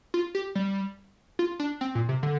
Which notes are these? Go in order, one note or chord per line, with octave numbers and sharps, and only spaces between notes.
F4
G4
G3
F4
D4
C4
A#2
C3
D3